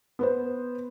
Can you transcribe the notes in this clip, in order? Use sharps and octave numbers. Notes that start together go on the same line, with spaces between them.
B3 B4 C5